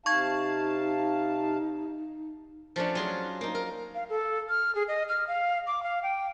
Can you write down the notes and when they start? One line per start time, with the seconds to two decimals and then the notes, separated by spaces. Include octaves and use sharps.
0.06 C3 D#4 F5 A5 C#6 G#6
2.76 F3 A3 C#4 D4
2.95 F#3 F4 G#4
3.41 A#3 D#4
3.55 A#4
3.95 F5
4.09 A4
4.49 F6
4.75 G#4
4.88 D#5
5.08 F6
5.27 F5
5.67 D6
5.83 F5
6.03 G5